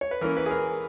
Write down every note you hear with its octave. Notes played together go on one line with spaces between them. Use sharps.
C#5
B4
E3 A#3 C#4 A#4
B4
G#4
A#4